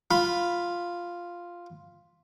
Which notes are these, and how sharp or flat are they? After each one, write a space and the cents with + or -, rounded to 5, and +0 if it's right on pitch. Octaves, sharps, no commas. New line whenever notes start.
F4 +0 B5 +5